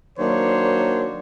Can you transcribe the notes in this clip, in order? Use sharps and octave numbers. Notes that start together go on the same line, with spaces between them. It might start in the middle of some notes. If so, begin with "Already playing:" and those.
D#3 F#3 A#3 D4 C5 C#5